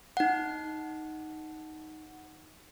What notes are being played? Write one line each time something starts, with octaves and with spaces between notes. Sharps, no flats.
D#4 F#5